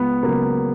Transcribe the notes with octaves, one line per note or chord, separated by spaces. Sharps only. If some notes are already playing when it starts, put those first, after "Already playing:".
Already playing: C#2 B3
C#3 F#3 A#3